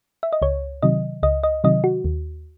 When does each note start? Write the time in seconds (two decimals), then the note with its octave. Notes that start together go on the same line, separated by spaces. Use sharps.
0.23 E5
0.33 D#5
0.42 C#2 C#5
0.82 C3 D#3 F#3 D#5
1.23 C#2 D#5
1.43 D#5
1.64 C3 D#3 F#3 D#5
1.84 F#4
2.05 D#2